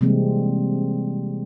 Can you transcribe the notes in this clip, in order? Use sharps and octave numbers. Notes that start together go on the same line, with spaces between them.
C3 E3 G3 G#3 A#3 C4